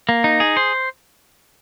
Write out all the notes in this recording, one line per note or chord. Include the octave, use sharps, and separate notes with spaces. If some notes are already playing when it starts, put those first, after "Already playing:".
A#3
D#4
G#4
C5